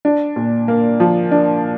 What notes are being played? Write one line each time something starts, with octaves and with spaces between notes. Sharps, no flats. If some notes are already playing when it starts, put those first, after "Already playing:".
D4
A#2
A#3
F3
D4